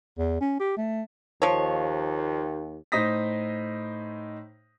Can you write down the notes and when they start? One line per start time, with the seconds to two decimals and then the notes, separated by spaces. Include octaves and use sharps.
0.19 E2
0.41 C#4
0.60 G4
0.77 A3
1.42 D#2 F3 C#5
2.92 A2 D#4 C5 D#6 A#6 B6